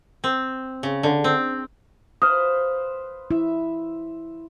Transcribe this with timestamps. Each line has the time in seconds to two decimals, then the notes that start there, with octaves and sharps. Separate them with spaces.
0.24 C4
0.83 C#3
1.03 D3
1.24 C4
2.22 B4 C5 F5 D#6 F6
3.31 E4 E5